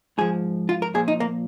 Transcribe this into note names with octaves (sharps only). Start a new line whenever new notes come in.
G#2 F3 G#4
F4
A#4
A#2 F3 G#4
D#4
A#3